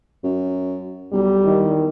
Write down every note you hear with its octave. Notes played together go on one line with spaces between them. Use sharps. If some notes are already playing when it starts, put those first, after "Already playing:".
F#2
B1 G3
E2 D#3